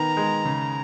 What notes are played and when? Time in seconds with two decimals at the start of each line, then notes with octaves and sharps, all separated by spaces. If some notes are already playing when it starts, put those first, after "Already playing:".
Already playing: D#3 B3 A#5
0.17 G#3
0.45 C#3